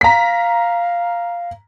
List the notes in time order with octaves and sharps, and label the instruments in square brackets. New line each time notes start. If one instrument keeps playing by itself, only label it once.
[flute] F5 [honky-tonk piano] A#5 B6